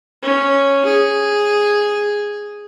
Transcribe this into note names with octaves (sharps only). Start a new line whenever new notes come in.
C#4
G#4